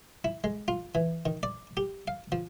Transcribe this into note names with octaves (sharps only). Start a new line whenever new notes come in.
E4
G#3
F4
E3
D#3
D5
G4
F5
F3